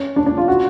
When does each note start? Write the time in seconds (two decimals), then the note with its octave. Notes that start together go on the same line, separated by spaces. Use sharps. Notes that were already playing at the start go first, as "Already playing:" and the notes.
Already playing: C#4
0.16 D4
0.26 D4
0.38 F4
0.48 F#4